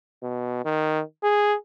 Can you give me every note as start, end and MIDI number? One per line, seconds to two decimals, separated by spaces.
0.23 0.63 47
0.65 1.02 51
1.23 1.55 68